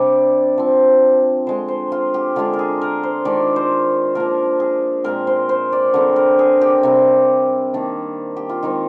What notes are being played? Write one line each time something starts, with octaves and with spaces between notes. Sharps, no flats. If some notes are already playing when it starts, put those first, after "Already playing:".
Already playing: C3 G3 D4 D5
F3 C4
D3 G#3 C4 C5
C5
F4
G4
D3 G#3 D4 F4
A#4
G#4
A#4
C5
D#3 G#3 D4 D5
C5
F3 A#3 D4 A#4
G#4
A#2 G#3 C4 A#4
C5
C5
D5
D3 G3 C4 A#4
A#4
G#4
G4
C3 G3 C4
D#3 A#3 D4
G4
F4
D#3 G#3 C4 D#4